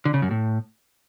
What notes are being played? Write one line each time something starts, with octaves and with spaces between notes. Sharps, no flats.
D3
C#3
F#2
A2